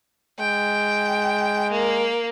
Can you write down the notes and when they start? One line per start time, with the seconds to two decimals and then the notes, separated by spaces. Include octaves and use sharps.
0.39 G#3 G5
1.71 A#3